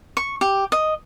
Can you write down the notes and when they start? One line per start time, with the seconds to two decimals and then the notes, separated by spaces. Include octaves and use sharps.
0.17 C#6
0.41 G4
0.72 D#5